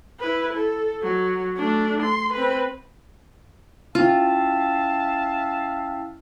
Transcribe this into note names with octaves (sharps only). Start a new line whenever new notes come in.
E4 B4
A4
F#3
A3 D4
C6
C4 B4
C#4 E4 F4 E5 F5 G5 A5